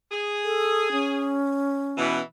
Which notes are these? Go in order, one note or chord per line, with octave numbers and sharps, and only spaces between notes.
G#4
A4
C#4
B2 E3